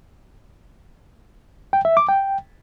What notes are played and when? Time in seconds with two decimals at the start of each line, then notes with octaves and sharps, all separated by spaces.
1.73 G5
1.85 E5
1.97 D6
2.09 G5